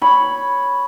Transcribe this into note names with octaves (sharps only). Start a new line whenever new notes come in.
C#5 B5